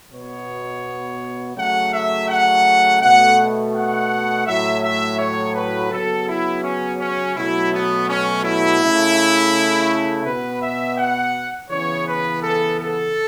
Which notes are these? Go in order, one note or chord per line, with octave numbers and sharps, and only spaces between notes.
B2 B3 C#5
C#3 F#3 A3 F#5
E5
F#5
B2 A3 F#5
F#5
A2 F#3 A3 E5
E5
C#5
B4
C#3 F#3 B3 A4
E4
C#4
C#4
B2 F#3 A3 E4
B3
C#4
E4
C#3 A3
B2 B3 B4
E5
F#5
C#3 E3 B3 C#5
B4
A4
A4